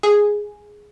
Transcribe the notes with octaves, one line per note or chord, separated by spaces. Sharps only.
G#4